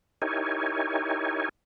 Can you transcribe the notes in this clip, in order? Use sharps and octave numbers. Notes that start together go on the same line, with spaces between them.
D#4 E4 G4 A#4 C#5 G#5